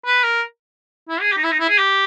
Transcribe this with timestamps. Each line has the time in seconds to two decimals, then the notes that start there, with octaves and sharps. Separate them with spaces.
0.06 B4
0.23 A#4
1.09 E4
1.21 G#4
1.32 G4
1.37 D#4
1.43 E4
1.51 D#4
1.60 E4
1.69 G#4
1.78 G4